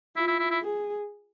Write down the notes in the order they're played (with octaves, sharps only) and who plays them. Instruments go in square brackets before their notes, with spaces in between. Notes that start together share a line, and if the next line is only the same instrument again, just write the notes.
[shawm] E4 [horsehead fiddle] F4
[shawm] E4
E4
E4
[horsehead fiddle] G#4